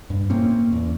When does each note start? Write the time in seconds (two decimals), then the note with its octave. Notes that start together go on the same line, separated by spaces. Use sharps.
0.10 G2
0.30 A2 A#3 C4 C#4
0.72 E2